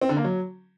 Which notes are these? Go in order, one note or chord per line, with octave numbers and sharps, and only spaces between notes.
C4
D3
A#3
F#3